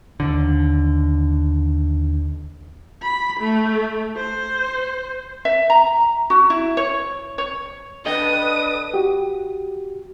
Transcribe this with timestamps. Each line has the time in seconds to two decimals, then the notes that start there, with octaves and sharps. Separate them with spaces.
0.20 D#2 D3
3.02 B5
3.40 A3
4.16 C5
5.45 E5
5.70 A#5
6.30 F#4
6.50 E4
6.77 C#5
7.38 C#5
8.06 D4 A4 B4 D#5 G5 D#6
8.94 F#4 G4